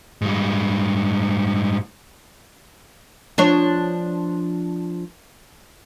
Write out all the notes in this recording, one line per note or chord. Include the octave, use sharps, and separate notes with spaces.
G#2 G3
F3 D4 C#5